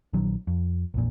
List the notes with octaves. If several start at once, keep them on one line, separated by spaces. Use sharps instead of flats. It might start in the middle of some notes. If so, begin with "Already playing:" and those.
A#1 D#3 F#3
F2
A#1 E2 A#2